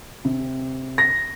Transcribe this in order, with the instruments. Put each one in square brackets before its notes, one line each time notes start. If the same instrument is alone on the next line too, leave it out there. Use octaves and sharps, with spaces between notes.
[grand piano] C3
[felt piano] A#6